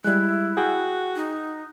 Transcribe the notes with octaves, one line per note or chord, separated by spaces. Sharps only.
G3 G#3 E4 F#6
F#4 G#4 G5
D#4